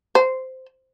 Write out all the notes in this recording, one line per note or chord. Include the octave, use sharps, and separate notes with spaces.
C5